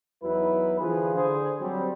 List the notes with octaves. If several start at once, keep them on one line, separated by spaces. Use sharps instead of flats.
E2 F#3 D#4 E4 B4
D3 E3 F3 F4 G#4 B4
D3 G#4 C5
F#3 G3 C4